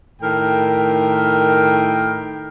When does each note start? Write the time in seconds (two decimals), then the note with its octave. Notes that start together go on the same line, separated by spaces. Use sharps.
0.21 A2 D#3 A#4 G5